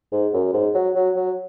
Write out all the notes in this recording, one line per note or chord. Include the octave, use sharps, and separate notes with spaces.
G#2
F#2
G#2
F#3
F#3
F#3